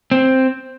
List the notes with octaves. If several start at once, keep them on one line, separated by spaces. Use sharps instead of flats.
C4